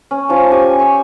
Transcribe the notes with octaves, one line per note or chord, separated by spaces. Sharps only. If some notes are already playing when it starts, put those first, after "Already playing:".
C#4
F3 C#4 A5
G4 G#5
C#6 E6